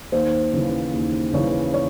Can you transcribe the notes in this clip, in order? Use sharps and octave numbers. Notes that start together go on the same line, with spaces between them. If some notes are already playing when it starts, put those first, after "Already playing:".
D#2 C5
C#3 E3
D#2
C#3 E3 C#5
C#5